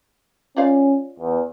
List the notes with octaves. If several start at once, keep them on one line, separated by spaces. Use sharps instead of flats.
C#4 F4 D5 F5
E2